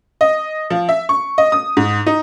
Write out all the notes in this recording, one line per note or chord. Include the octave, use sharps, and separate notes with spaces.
D#5
F3
E5
C#6
D#5
D#6
G#2
D#4